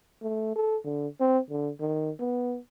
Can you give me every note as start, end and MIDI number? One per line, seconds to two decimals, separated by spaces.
0.22 0.54 57
0.56 0.77 69
0.85 1.07 50
1.20 1.38 60
1.50 1.70 50
1.80 2.10 51
2.19 2.57 59